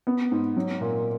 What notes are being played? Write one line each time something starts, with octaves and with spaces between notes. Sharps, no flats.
B3
G#2
F#3
A#2